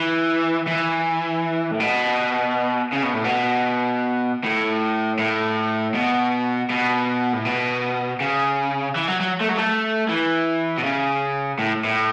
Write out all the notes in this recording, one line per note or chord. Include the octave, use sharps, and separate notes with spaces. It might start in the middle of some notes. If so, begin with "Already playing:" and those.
Already playing: E3
E3
A2
B2
C#3
B2
A2
B2
A2
A2
B2
B2
A2
B2
C#3
E3
F#3
F#3
A3
F#3
A3
E3
B2
C#3
A2
A2